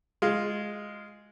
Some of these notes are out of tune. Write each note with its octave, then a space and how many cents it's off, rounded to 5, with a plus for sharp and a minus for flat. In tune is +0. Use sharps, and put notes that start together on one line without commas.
G#3 +0 F4 +0